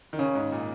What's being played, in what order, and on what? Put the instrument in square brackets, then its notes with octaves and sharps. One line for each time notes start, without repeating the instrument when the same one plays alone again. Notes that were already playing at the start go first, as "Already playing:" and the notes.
[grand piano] D#3
[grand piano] C#3 [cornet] C#4
[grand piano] G#2
A#2